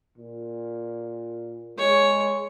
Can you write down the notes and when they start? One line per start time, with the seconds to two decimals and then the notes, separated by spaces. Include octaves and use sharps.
0.18 A#2
1.78 G#3 C#5